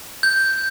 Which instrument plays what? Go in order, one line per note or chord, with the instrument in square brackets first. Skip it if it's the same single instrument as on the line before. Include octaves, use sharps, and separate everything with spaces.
[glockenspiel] G6